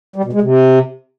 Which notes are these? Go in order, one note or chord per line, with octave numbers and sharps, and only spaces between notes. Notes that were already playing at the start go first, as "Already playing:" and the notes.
G3
B2
G#3
C3